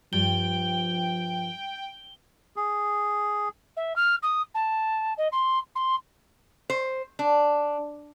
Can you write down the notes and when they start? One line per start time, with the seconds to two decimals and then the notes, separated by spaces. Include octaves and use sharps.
0.13 G2 F3 G5 G7
2.56 G#4
3.77 E5
3.96 F6
4.23 D#6
4.54 A5
5.17 D#5
5.32 C6
5.75 C6
6.70 C5
7.19 D4